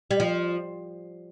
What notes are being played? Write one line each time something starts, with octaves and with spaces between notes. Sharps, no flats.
G3
F3